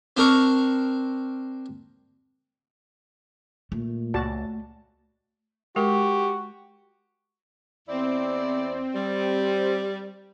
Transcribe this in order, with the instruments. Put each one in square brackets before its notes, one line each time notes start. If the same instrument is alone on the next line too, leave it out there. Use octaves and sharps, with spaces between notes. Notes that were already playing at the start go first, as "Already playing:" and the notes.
[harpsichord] C4 D4 A#4 C#6
[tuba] A#2 [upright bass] A3
[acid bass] C#2 [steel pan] F#4 D5 A5
[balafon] G#3 A#4 [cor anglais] F#4 [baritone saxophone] G4
[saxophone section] E2 E4 D5 [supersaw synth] C4
[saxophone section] G3